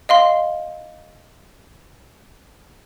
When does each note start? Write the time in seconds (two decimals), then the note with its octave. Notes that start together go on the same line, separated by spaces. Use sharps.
0.09 D#5 F5 C6